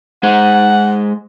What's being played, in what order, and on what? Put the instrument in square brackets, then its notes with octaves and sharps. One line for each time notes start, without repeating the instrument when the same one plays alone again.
[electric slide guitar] G#3 G#4 C5 [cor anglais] F#5